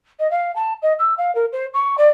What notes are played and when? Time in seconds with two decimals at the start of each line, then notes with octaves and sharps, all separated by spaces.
0.19 D#5
0.30 F5
0.55 A5
0.82 D#5
0.98 E6
1.17 F5
1.35 A#4
1.52 C5
1.73 C#6
1.97 D5